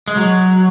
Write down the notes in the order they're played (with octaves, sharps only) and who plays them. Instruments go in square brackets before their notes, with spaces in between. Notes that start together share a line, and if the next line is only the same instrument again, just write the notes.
[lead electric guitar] G#3
F#3